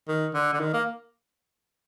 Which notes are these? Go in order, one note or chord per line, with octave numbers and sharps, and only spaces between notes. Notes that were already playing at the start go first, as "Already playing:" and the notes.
D#3
D3
D3
D#3
A#3